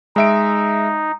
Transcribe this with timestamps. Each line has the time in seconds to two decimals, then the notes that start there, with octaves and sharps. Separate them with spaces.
0.16 G#3 D#4 E5 D7